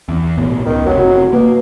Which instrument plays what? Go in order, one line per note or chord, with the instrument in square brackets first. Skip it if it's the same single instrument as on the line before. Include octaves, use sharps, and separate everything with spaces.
[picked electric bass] E2
B1 A2 B3
[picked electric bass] C#2 [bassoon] D#3
[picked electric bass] F#1 C3 [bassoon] F#3
[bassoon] B2 [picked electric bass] A#3